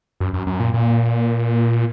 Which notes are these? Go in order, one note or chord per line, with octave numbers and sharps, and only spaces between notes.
F#2
F#2
F#2
A#2
A#2